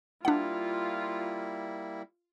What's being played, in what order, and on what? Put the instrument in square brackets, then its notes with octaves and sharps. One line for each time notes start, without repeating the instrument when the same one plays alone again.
[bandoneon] G3 A#3 E4 [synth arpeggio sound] D4 F#5 [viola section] F4